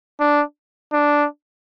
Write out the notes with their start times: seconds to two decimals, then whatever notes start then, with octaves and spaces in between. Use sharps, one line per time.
0.20 D4
0.93 D4